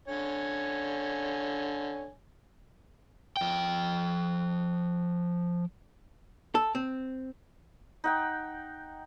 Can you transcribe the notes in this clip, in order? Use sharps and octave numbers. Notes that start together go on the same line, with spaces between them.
D3 C#5 G#5
F3 G5
A4
C4
D#4 F#5 G5